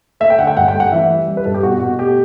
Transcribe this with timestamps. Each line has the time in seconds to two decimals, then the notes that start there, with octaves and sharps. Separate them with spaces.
0.20 A3 E5
0.30 G5
0.39 D3 F#5
0.47 G5
0.57 G2 F#5
0.68 G5
0.74 A3
0.80 F#5
0.92 E3 E5
1.10 G3
1.28 G3
1.37 B4
1.45 G2 A4
1.54 G4
1.63 B2 F#4
1.80 B2 F#4
1.99 A3 G4